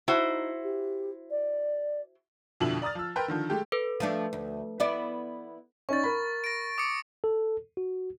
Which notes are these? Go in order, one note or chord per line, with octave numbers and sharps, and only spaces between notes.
D#4 E4 F#4 C5
G4
D5
F2 B2 D3 E4 F#7
D5 A#5 D#6 F6 A6
F3 E6
A#4 B4 G5 A#5 C6 G6
D3 D#3 F3
G#3 A3 G4
A4 B4
F3 A3 D4
D2
B3 E4 D5
C#4 D#4 D5 C#6 A6
A#4 B5
A#6 D7
D6 D#6 C#7
A4
F#4